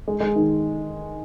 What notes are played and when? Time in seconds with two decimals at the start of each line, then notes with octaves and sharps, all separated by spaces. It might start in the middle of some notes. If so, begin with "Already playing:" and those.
0.08 G#3
0.20 G#3
0.36 D#3